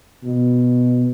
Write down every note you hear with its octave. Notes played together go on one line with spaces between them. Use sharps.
B2